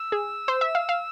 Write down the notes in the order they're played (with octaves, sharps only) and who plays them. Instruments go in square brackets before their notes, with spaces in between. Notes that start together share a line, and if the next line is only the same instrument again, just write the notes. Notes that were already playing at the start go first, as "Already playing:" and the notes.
Already playing: [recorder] E6
[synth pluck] G#4
C5
E5
F5
F5